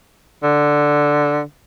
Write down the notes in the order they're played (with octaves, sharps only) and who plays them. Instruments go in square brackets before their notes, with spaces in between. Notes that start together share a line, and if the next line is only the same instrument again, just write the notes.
[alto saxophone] D3